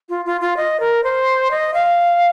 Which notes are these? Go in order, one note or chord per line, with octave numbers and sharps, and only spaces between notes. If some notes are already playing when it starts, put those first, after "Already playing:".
F4
F4
F4
D#5
A#4
C5
D#5
F5